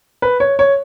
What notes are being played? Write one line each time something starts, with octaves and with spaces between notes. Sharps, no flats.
B4
C#5
C#5